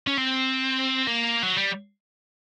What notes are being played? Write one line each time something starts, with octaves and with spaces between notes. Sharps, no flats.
C#4
C4
A#3
F#3
G3